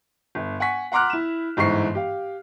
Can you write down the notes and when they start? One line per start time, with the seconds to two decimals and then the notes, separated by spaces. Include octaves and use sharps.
0.35 G1
0.60 F#5 G#5 C#6 B6
0.92 F#5 A#5 C6 D6 F6 F#6
1.10 E4 E7
1.57 G1 G#2 E3 C5 C#6 C7
1.95 G4 F5